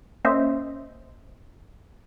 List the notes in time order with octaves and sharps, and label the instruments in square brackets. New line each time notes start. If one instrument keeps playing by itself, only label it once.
[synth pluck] A#3 C#4 C5 D#5 E5